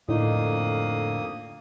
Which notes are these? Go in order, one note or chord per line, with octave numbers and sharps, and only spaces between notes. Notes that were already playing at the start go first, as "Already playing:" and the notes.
F2 A2 D3 A#3 D#4 D#6